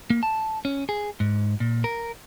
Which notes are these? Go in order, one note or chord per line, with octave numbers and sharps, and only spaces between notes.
A#3
A5
C#4
G#4
G#2
A#2
A#4